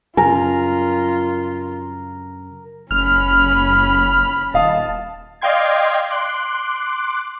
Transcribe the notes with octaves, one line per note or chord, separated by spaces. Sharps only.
F#2 C#3 F4 A#4 G#5
F#1 C#4 B5 F6
D#1 D#5 F5 A5 D#6
D5 D#5 F5 G5 C6 G#6
C6 D6 F#6